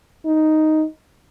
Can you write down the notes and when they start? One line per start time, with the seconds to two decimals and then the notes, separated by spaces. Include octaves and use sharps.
0.26 D#4